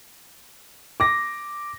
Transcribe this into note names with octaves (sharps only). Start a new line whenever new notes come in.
D6 A#6